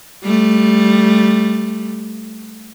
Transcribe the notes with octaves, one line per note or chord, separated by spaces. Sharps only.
G3 A3